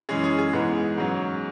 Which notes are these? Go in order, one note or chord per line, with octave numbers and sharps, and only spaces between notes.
F#2 E3 G#3 C#4 G#4
G#4
G#4
G#2 E3 G#3 B3
G#2 F#3 C#4